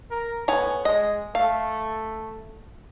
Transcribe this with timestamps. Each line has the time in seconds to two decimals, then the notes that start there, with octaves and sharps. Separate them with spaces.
0.11 A#4
0.48 A2 B3 C#5 G#5
0.85 G#3 D#5
1.35 A3 F5